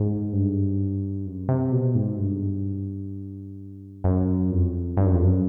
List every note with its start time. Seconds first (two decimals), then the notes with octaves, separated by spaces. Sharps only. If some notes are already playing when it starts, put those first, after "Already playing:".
Already playing: G#2
0.33 G2
1.26 F#2
1.49 C3
1.72 B2
1.95 G#2
2.19 G2
4.04 F#2
4.51 F2
4.97 G2
5.05 F#2
5.14 F2
5.24 F#2